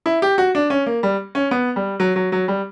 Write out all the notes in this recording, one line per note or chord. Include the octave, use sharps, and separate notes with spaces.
E4
G4
F#4
D4
C#4
A#3
G3
C#4
B3
G3
F#3
F#3
F#3
G3